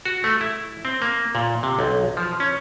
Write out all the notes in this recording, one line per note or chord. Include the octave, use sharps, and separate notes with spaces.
F#4
A3
E4
C4
A#3
A#2
C3
B1
F3
C#4